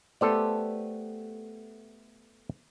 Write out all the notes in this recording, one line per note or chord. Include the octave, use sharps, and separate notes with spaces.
A3 B3 G4 A4 C5 D5